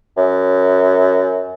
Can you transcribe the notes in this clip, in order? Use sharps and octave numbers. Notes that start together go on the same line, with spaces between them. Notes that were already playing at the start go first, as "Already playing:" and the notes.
F#2